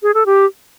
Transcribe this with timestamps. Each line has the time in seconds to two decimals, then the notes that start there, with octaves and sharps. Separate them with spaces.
0.03 G#4
0.14 A4
0.26 G4